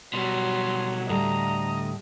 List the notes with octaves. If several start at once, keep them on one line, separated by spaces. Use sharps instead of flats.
B2 F#3 G3 C6
D2 A2 G3 D#5 A#5